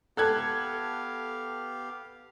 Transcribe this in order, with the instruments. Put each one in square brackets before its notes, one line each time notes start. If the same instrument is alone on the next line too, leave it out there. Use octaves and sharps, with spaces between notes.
[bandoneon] B3 G4 F5 [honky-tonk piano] A4 F#6 G#6